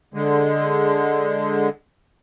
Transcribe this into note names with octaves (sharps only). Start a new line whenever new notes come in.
D3 G#3